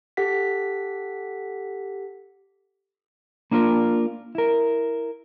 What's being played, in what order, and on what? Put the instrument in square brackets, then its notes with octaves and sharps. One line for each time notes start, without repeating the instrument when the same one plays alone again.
[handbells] G4 A4 F#5 B6
[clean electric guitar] A#3 D4 F4 A4 A#4
E4 A#4